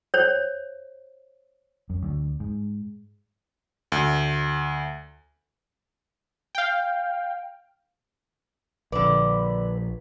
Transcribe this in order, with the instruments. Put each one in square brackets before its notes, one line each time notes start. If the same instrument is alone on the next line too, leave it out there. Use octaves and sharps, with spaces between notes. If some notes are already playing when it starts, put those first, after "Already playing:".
[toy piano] C5 C#5
[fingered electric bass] F#2
D2
G#2
[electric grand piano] D2
[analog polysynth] F5 G5
[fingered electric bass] A#1 [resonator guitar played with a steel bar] D3 D5 [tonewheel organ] B4